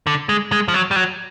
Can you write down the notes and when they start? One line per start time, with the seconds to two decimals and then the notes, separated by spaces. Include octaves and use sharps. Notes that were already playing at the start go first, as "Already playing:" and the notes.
0.07 D3
0.29 G#3
0.52 G#3
0.68 F3
0.74 F#3
0.91 G3
0.96 F#3